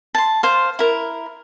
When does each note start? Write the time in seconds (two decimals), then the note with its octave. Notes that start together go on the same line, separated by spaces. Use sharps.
0.15 A5 C6
0.43 C5 F5
0.79 E4 A#4